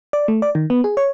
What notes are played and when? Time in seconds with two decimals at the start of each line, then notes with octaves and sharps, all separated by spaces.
0.13 D5
0.28 A3
0.42 D5
0.55 D#3
0.70 B3
0.84 G#4
0.97 C#5